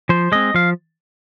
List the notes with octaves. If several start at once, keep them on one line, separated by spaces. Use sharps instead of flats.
F3 C5
G#3 C4 D#5
F3 F5